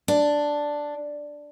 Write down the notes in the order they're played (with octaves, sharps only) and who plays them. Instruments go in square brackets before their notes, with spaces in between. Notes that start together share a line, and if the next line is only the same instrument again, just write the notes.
[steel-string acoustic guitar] D4